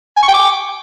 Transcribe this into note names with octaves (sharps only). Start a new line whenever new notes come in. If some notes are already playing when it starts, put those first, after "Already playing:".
G#5
C#6
G5
D6